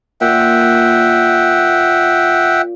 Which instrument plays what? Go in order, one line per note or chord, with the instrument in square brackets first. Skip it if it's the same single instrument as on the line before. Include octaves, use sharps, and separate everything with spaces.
[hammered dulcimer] A#2 [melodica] E5 F#5 G5